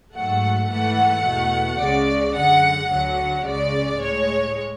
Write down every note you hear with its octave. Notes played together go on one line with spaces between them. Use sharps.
G#2 F#3 A3 F#5
G#2 E3 A3 F#5
E2 B2 A3
C#2 C#3 G#3 D5
F#2 D3 G#3 F#5
D2 D3 F#3 F#5
C#2 C#3 G#3 D5
A2 G#3 C#5